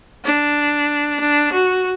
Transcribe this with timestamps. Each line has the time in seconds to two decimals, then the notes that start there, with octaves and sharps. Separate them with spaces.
0.25 D4
1.20 D4
1.52 F#4